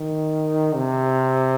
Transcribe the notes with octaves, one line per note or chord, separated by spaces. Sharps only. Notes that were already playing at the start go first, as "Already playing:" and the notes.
Already playing: D#3
C3